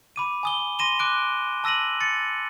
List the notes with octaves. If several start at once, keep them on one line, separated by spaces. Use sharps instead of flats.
B5 D6 D#7
G#5 D#6 G7
C6 A#6 D#7 E7 G7
D6 F#6 D7
A5 E6 A#6 D#7 F#7
A6 C#7